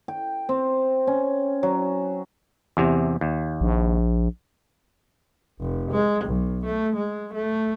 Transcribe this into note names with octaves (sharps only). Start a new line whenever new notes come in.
G5
C4
C#4
F#3
E2 C3
D#2
A#1
F1
G#3
B1
A3
G#3
A3